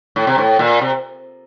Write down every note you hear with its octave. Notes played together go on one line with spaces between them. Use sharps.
A2
C3
A2
A#2
C3